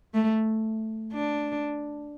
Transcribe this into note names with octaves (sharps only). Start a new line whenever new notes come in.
A3
D4